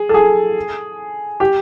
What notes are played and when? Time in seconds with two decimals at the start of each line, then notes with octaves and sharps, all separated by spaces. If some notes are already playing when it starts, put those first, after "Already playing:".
Already playing: G#4
0.09 A4
0.14 G#4
1.40 G4